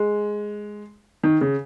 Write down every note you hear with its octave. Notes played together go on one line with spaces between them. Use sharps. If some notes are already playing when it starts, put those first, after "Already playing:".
Already playing: G#3
D#3
C#3